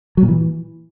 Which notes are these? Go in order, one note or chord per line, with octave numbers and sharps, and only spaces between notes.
F#3
A#2
E3